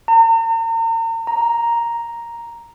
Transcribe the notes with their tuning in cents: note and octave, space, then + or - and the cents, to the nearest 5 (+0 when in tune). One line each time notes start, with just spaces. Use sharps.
A#5 -40
A#5 +0